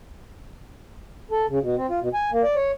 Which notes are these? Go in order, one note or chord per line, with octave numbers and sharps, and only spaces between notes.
A4
C#3
B2
C4
F4
B2
G#5
A#3
D5
C#5